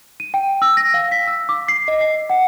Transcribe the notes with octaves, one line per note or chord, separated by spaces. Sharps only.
D#7
G5
E6
A#6
F5
B6
E6
D6
C7
D#5
C7
F#5